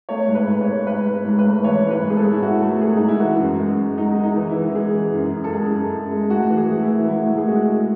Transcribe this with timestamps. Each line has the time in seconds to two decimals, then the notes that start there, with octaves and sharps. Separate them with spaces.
0.09 A3 C#5
0.28 G#2
0.35 B4
0.48 G#2
0.61 C#5
0.68 G#2
0.87 G#2 B4
1.06 G#2
1.25 G#2
1.39 B4
1.45 A3
1.64 E3 C#5
1.84 G#2
1.90 B4
2.03 G#2
2.10 G#4
2.16 A4
2.22 G#2
2.31 E4
2.42 G#2 F#4
2.62 A3
2.81 A3 G#4
2.96 G#2 D#4
3.08 E4
3.20 E3 F#4
3.39 F#2
3.59 G#3
3.78 F#2
3.98 G#3 D#4
4.17 G#3
4.23 D#4
4.36 E3
4.49 E4
4.55 E3
4.75 G#3 G#4
4.95 E3
5.14 F#2
5.34 F#2
5.44 A4
5.53 G#3 G#4
5.73 F#2
5.92 F#2
6.11 G#3
6.30 A2 F#4
6.50 E3
6.57 G#4
6.70 A2
6.82 E4
6.89 E3
7.08 A2 E4
7.27 A2
7.38 G#4
7.47 G#3 F#4
7.67 G#3